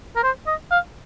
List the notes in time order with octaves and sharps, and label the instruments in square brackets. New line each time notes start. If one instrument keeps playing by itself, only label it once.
[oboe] A#4
C5
D#5
F5